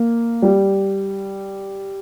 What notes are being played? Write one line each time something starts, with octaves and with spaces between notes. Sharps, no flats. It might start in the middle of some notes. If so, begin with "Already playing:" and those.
Already playing: A#3
G3